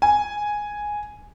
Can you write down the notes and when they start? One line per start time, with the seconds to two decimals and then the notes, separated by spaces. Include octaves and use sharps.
0.02 G#5